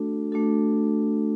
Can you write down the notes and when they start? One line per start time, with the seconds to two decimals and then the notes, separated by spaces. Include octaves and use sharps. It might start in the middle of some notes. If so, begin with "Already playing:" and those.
Already playing: A3 D4 F#4 A4
0.32 A3 D4 F#4 A4